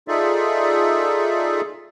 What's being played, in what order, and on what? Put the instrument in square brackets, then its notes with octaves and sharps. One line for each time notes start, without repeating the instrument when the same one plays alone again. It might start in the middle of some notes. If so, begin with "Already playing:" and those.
[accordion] D#4 F4 G#4 A4 D5 E5